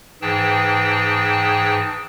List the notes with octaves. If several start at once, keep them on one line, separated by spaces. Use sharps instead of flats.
G#2 E3 G#4 G5 A5